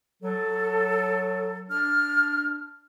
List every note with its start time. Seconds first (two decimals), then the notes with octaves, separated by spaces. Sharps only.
0.23 F#3 A4
1.70 D4 F6